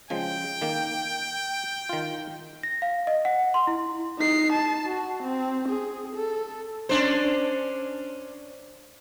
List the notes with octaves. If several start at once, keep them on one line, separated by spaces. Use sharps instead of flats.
C#3 F3 G#3 G5
D#3 A#3
D#3 F4
A#6
F5
D#5
F#5
C6
E4
D#4 C7
A5
F#4
C4
G#4
A4
C#4 D4 C5